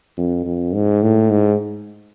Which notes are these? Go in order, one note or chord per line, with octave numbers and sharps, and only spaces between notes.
F2
F2
G#2
A2
G#2